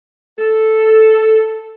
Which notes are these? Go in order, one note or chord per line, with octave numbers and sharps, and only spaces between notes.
A4